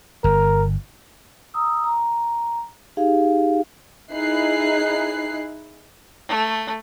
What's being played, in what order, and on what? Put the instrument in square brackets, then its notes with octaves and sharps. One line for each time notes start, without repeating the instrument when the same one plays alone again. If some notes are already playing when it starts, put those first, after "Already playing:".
[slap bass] G1 [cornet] A#4
[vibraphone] A#5 D#6 E6
A#5
D#4 G4 G#4 F5
[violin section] D#4 E4 G#4 F#6 C7
[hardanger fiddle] A3